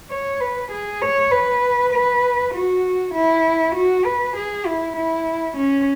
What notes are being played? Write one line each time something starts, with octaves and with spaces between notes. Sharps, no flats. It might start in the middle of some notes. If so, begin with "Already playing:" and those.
C#5
B4
G#4
C#5
B4
B4
F#4
E4
F#4
B4
G#4
E4
E4
C#4